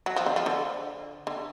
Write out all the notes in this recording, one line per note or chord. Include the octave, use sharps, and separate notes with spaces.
F#3
F3
D3
F3
D3
D3